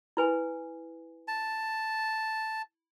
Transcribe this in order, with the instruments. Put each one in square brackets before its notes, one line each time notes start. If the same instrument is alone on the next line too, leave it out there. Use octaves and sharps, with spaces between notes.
[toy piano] E4 B4 G#5
[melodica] A5